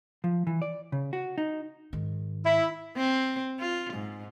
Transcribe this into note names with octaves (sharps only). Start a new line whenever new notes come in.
F3
E3
D5
C#3
F#4
D#4
G#2 D#3
E4
C4
F4
G#2